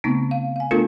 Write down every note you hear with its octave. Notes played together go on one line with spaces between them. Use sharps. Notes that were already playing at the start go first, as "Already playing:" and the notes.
C#3 A3 B3 C4 D#4
F5
F5 G#5
A3 B3 D4 F4 A4 A#4